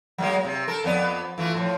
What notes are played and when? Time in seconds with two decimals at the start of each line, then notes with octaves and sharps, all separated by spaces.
0.18 F#3 G#3 A#3
0.45 C3
0.68 A4 A#4
0.84 F2 B3 D5
1.38 E3 A3 F4
1.54 A2 F3